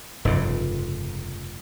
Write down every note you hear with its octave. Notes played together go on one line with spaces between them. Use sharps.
F1 G2 C#3 F3